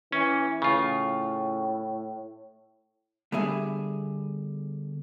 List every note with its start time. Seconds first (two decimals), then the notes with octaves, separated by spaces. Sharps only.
0.12 E3 C#4
0.62 A2 C#3 F4
3.32 D3 G3 B3 G#4 E5